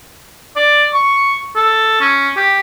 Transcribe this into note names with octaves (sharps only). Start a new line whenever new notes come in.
D5
C#6
A4
C#4
G4